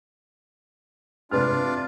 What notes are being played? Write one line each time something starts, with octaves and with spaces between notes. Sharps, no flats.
C3 D4 F4 B4 F6